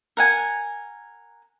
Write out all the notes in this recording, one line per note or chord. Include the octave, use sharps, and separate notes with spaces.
A#4 F#5 G#5